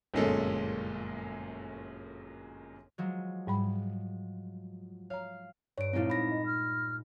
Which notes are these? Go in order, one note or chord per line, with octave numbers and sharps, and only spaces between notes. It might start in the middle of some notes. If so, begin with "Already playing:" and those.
G1 F#2 A#2 G#3 C#4 A4
F3 F#3 G#3
G#2 G3 B5
C#5 F5 A#5
G2 C#5 D7
A#2 G#3 C4 D#4 E4
B5 A#6
D#5
F6